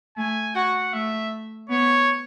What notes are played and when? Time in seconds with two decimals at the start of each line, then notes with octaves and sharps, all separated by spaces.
0.17 A3 G#5
0.55 F#4 F#5
0.93 A3 E5
1.70 B3 C#5